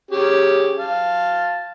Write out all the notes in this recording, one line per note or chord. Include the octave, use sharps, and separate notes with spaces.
C#4 G4 G#4
F5 A5